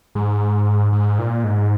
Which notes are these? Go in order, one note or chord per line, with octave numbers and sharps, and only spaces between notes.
G#2
G#2
A#2
G#2